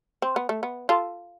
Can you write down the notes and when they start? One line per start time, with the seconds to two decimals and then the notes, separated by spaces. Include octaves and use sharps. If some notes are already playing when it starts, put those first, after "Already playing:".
0.22 C4
0.36 B3
0.49 A3
0.63 B3
0.89 F4 A4